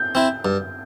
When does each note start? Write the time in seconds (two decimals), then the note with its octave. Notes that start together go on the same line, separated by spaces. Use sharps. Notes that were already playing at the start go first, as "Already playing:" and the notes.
Already playing: G6
0.15 C4 E4
0.45 G2